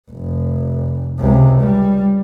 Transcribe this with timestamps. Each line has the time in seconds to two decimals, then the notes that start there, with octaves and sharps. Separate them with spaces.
0.11 F1
1.19 C#2 C3
1.60 G3